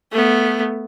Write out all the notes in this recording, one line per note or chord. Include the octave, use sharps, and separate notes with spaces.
A3 B3